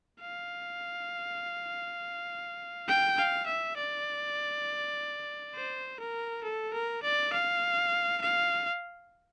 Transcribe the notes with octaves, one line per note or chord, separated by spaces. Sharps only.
F5
G5
F5
E5
D5
C5
A#4
A4
A#4
D5
F5
F5